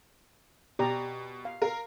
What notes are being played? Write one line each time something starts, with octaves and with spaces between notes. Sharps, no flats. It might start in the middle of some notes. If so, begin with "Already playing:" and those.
B2 G4 D5 A#5
F5
A#4 F5